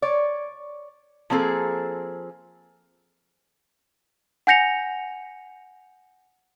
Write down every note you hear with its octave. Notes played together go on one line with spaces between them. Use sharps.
C#5 D5
F3 A#3 C4 G#4 A4
F#5 G#5 G6 A#6 C#7 F7